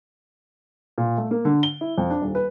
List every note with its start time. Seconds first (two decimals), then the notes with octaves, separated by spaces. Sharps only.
0.98 A#2
1.17 A3
1.31 A#3
1.45 D3
1.63 G7
1.81 E4
1.98 F2
2.10 D4
2.21 D#1
2.35 B4